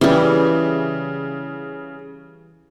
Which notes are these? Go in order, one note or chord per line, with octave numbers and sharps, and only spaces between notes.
C#3 E3 G3